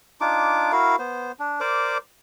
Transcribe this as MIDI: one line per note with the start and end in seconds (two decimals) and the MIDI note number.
0.21 0.72 62
0.21 0.72 63
0.21 0.72 65
0.21 0.72 86
0.72 0.96 64
0.72 0.96 66
0.72 0.96 70
0.72 0.96 77
0.99 1.32 59
0.99 1.32 72
1.39 1.60 62
1.60 1.98 70
1.60 1.98 72
1.60 1.98 74
1.60 1.98 86